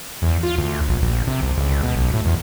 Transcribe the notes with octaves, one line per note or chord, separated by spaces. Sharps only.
E2
F4
D2
A#1
A#1
C3
C2
C#2
B2
B1
A2
E2